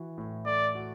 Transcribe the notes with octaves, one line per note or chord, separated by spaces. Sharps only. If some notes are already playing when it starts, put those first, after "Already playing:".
Already playing: E3 F#4
A2
A3 D5
F#4